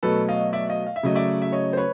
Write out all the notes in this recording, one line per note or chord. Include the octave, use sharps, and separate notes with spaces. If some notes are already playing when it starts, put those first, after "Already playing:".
B2 F#3 A3 A4 B4
D#5 F5
D5 E5
D#5 F5
F5
E5
C#3 F#3 A3 D#5
D5 E5
E5
C#5 D#5
C5
B4 C#5